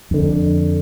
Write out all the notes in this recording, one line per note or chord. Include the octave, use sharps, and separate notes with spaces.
F2 D3